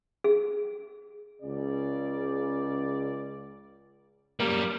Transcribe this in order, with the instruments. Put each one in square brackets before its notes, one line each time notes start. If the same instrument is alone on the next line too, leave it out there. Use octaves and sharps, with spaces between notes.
[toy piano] G#4
[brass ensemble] C#2 C#3 D5
[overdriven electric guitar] F#2 G3 [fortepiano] A#3